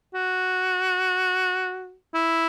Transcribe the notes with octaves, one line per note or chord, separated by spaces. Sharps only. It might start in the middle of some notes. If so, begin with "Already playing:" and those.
F#4
E4